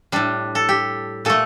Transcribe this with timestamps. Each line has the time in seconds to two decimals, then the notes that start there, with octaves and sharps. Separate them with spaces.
0.12 A2 G3 D4
0.55 A4
0.69 G4
1.25 A#2 A3 A4